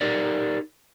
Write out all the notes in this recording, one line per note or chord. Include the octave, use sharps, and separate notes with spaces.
D#4 G4 A#4 D5